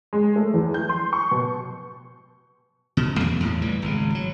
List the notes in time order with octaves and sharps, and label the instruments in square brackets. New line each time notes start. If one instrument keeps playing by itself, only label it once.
[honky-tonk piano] G#3
A3
E2
G6
C6
C#6
B2
[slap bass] D#1 B2
E2 A#3
E2 A2
E2 A2 E3 G3
G#1 C#3
F#3